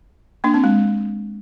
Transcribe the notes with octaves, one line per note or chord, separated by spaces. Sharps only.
A#3 D4
C4
G#3